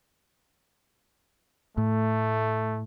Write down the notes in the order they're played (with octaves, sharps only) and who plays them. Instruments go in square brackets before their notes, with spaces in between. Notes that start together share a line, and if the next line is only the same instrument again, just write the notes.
[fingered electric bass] A2 [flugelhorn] A3